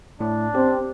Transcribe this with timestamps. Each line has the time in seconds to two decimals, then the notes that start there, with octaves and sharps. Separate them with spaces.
0.20 A2 D4
0.55 C4 G4